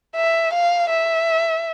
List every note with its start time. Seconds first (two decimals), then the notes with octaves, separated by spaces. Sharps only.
0.16 E5
0.53 F5
0.90 E5